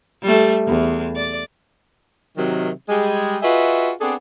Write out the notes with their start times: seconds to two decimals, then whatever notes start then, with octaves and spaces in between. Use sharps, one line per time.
0.22 G3 A3
0.67 E2
1.16 D5
2.37 C3 D#3 F#3
2.89 G3 G#3 G#4
3.43 F4 F#4 G#4 B4 D#5 E5
4.00 B3 C4 D4 G#4 A4